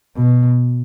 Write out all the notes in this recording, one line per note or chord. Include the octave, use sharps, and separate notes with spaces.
B2